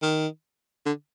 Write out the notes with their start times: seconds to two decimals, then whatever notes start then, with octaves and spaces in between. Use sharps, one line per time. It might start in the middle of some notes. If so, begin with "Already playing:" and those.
0.02 D#3
0.86 D3